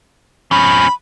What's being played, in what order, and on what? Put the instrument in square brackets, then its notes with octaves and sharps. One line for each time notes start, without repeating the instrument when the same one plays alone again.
[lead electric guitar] F3 C#4 [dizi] B5